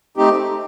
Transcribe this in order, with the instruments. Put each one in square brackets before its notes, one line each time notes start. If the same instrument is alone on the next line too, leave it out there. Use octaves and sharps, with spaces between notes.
[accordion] A3 C4 D#4 G4